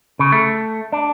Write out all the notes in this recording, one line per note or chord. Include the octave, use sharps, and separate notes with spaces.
C#3
A3
D4